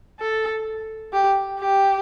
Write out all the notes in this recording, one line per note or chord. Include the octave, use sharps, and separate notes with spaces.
A4
G4
G4